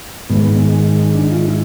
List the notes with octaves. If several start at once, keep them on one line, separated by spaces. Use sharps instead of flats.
G#2 D#3 G#3 B3
D4
F4
E4